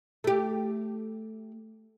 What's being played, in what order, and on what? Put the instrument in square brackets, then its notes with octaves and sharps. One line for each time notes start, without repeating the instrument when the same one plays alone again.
[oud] A3 G4